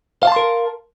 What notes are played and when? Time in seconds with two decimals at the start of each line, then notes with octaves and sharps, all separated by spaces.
0.23 F5
0.27 A5
0.32 C6
0.36 A#4